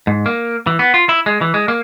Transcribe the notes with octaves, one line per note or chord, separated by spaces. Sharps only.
G#2
A#3
E3
B3
F4
E4
G#3
E3
G#3
A#3